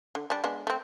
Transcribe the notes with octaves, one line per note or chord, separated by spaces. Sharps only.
D3
G3 D4
G#3 B3 D4
A3 C4